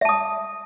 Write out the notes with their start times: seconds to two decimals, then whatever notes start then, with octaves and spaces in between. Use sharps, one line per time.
0.01 E5
0.05 A5
0.09 D#6